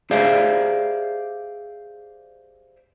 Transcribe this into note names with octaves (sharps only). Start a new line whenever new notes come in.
G4 G#4 C5 D5 E5 F5